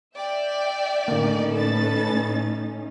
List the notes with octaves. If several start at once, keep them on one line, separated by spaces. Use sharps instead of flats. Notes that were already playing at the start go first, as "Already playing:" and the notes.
D5 E5 G5
A2 D3 A#3 C#4 D#4
A4 B4 A6